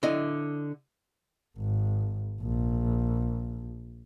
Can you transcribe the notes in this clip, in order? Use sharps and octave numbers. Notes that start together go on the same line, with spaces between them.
D3 E4 D#5
G#1
A#1